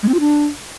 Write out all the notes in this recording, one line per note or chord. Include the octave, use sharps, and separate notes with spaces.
G#3
C4
F4
D4